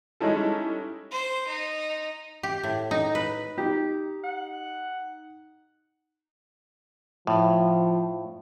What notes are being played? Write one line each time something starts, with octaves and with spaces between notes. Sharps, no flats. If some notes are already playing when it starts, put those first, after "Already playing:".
G3 G#3 C#4 D#4 E4 A4
C5
D#4
G4
A2
D#4
B4
D#4 G4
F#5
A2 F3